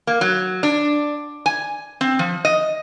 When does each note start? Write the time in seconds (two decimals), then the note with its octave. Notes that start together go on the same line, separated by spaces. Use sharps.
0.07 A#3
0.21 F#3
0.63 D4
1.46 G#5
2.01 C4
2.19 F3
2.45 D#5